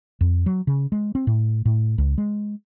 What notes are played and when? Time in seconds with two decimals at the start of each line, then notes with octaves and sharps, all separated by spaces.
0.21 F2
0.46 F#3
0.67 C#3
0.92 G#3
1.15 C4
1.27 A2
1.65 A2
1.98 C#2
2.18 G#3